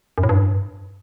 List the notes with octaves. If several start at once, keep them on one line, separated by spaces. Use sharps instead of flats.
F#2
A2
G2